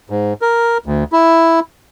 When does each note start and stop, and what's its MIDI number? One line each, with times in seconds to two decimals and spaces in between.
0.10 0.33 44
0.42 0.78 70
0.86 1.04 38
1.12 1.60 64